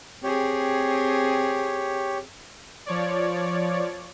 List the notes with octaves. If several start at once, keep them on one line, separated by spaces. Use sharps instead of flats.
C4 G4 G#4 C#5
F3 C#5 D5